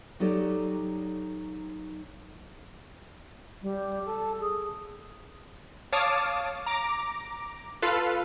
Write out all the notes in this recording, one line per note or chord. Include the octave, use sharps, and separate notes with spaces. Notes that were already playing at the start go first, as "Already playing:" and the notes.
F#3 D#4 G4 A4 C#5 D5
G3
A4
G#4
C#5 F5 A5 D6 D#6
A#5 D6
F4 A4 B4 F5